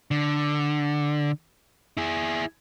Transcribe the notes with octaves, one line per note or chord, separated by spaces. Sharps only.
D3
E4 G#4